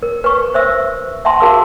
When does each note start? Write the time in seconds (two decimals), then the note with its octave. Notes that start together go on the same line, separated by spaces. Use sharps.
0.03 A#4
0.24 B4 C#6
0.54 C5 E5 E6
1.25 E5 F#5 A5 C6
1.40 F#4 G#4 A#4 F5 E6